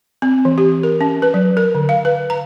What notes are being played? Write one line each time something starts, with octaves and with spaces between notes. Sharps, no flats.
C4
E3
G4
A#4
C#4
B4
F#3
A#4
D3
F5
B4
A#5